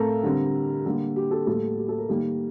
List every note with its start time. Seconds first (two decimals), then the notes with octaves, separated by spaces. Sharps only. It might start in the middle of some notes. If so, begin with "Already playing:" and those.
Already playing: A2 A3 C4 A4 A#4 F5
0.23 D3 G3 C4
0.86 D3 G3 A#3
1.16 G4
1.31 A4
1.47 A2 G3 A#3 A4
1.78 G4
1.89 A4
1.98 A#4
2.08 D#3 G3 A#3